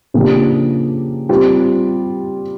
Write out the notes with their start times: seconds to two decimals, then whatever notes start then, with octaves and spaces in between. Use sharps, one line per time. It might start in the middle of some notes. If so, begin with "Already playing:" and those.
0.14 C#3 F3 A#3 D4 G4
1.29 G3 C4 F4